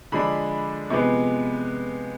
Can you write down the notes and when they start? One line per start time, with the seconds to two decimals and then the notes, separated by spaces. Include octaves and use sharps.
0.12 D3 F3 G#3 D4 B5
0.90 C3 F3 G#3 B3